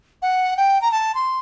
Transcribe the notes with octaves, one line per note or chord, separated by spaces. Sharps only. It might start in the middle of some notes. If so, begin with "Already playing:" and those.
F#5
G5
A#5
A5
C6